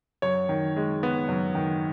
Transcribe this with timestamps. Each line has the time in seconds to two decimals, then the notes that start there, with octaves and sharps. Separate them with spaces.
0.22 F#2 C#5
0.49 D#3
0.76 G#3
1.03 B3
1.28 F#2
1.55 D#3